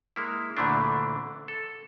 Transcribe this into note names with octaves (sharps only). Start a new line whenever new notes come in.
G#3 A#3 E4
D2 A#2 D3 E3 A3 D4
A4